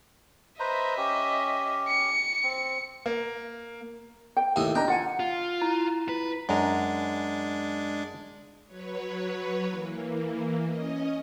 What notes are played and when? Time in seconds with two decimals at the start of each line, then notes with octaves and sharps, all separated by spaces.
0.60 B4 C5 D#5 E5 A#5
0.97 C#4 G4
1.88 C#7
2.43 C4
3.06 A#3
4.37 G5
4.56 D#2 A2 D#5
4.75 D4 D#5 G5 A#5
4.88 F4 F#5 G#5
5.20 F4
5.62 E4 A#5
6.09 B4
6.49 F#2 G#3 D4 A#5
8.66 F#3 B4 C#5
9.69 E3 A#3
10.66 C#4 D#5